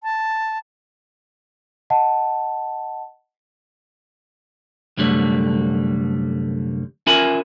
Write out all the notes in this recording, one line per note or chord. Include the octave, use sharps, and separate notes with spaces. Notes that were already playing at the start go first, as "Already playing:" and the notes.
A5
D#5 F#5 A5
C2 F#2 D3 G3 A3
C#4 F4 A#4 E5 G#5 B5